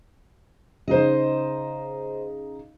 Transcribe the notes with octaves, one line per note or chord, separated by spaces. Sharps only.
C#3 D#4 C5 D#5